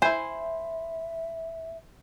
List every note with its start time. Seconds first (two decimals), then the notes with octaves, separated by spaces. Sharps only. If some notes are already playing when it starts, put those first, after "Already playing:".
0.02 E4 C5 E5 G#5